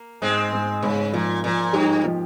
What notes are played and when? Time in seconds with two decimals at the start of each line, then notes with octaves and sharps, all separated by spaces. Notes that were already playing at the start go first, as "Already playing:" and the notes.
Already playing: A#3
0.22 G#2 G#3 C4
0.52 G#2
0.82 G#2 C#3
1.13 A#2 F3
1.43 A#2 F3
1.73 G2 G4
2.04 F3